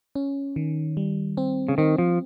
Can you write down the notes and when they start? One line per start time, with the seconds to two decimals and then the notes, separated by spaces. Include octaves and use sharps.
0.15 C#4
0.56 D#3
0.97 G3
1.37 C4
1.69 C#3
1.78 D#3 C4
1.98 F3